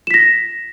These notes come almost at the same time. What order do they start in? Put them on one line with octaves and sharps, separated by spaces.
E7 B6 A#6